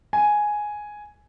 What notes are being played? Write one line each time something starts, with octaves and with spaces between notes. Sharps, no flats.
G#5